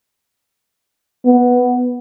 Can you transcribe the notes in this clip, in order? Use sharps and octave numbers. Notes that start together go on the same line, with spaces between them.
B3